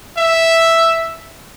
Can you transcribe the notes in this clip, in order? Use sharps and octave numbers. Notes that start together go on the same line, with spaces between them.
E5